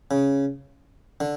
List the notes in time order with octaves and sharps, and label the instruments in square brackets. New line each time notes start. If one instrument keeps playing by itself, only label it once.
[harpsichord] C#3
D3